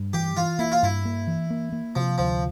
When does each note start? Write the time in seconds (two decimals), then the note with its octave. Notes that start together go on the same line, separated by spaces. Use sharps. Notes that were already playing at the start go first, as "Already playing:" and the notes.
Already playing: G2
0.13 E3 G4
0.37 E3 F4
0.59 A#3 E4
0.72 F4
0.83 G2 E4
1.05 A#3
1.27 E3
1.50 A#3
1.72 A#3
1.95 C3 F3
2.18 D2 F3